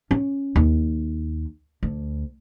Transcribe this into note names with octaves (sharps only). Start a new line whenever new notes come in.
C#4
D#2
D2